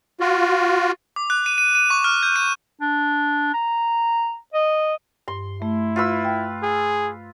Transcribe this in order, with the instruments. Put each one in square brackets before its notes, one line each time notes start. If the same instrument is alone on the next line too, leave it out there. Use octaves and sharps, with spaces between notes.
[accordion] F4 F#4
[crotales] D6
F#6
D#7
D#7
D#7
C#6
F6
G6
D#7
[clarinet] D4
A#5
D#5
[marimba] G2 [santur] C6
[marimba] A3 [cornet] E4
[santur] F4 B4 E6
[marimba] G5
[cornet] G#4